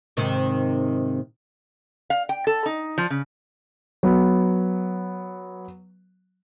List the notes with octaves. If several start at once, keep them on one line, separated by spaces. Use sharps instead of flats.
G#2 C3 D#3
F5
G5
A4
D#4
F3
C#3
F#3 B3